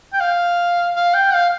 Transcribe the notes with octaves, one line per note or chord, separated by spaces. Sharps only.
G5
F5
F5
G5
F5